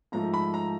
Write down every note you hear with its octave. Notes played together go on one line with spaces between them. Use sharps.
G#2 F3 A3 A#5
B5
A#5